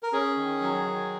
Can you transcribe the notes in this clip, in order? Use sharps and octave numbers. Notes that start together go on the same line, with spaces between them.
A#4
C#4 G#4
D#3
F#3
D#3